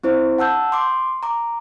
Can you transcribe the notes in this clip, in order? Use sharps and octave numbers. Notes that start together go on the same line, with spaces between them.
C4 E4 C5
F#5 A5 E6 G6
C6 D6
A#5 D6